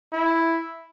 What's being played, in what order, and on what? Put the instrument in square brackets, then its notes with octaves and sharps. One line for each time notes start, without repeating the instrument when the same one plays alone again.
[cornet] E4